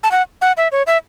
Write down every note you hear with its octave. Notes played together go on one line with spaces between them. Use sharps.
A5
F#5
F#5
E5
C#5
E5